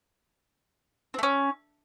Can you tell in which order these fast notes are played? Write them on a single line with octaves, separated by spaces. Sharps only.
C4 A3 C#4